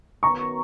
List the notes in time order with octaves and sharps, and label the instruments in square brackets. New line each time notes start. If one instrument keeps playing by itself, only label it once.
[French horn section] F#2 D#3 F#3 B3 [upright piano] A#5 C#6